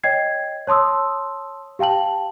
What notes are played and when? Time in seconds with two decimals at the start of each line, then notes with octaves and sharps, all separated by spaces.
0.03 C#5 D#5 G5 G#6 C7
0.67 C#5 A5 C6 D#6 E6
1.79 G4 F5 G5 A5 F#7